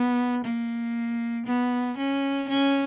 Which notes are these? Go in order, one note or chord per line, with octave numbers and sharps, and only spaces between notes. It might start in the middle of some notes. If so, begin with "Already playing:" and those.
Already playing: B3
A#3
B3
C#4
C#4